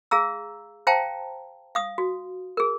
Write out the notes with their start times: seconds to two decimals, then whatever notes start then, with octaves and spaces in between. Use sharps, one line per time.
0.11 G#4 F5 A#5 E6
0.87 C5 F5 G5 A5 A#5
1.75 F5 D#6
1.98 F#4
2.57 G#4 A#4